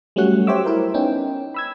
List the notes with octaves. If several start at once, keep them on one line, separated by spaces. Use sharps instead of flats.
F#3 G3 A3 C#4 F#4 F#5
G4 C5 C#5 E5 D6 E6
E4 A#4 C5
B3 C#4 D#4 G5
B5 E6 G#6